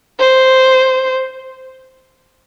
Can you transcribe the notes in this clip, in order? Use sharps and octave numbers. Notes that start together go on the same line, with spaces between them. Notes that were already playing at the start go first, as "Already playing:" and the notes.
C5